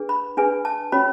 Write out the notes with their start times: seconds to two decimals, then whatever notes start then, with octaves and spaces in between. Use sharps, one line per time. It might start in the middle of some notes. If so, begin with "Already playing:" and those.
Already playing: D4 G#4 B4
0.09 B5
0.37 D4 G#4 B4 G#5
0.65 A5
0.92 C#4 F#4 C#5 B5